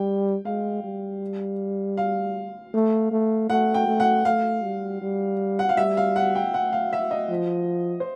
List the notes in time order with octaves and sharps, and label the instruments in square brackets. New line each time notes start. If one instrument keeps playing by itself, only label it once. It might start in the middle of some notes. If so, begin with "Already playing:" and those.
Already playing: [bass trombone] G3 [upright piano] G5
[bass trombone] G#3 [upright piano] F5
[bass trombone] G3
[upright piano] F5
[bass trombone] A3
A3
[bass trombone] A3 [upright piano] F#5
[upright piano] G5
[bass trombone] A3
[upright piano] F#5
[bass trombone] A3 [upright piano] F5
[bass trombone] G3
G3
[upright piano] F#5
F5
[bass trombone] G3 [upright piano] E5
[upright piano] F5
F#5
G5
F#5
F5
E5
D#5
[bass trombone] F3
[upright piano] C5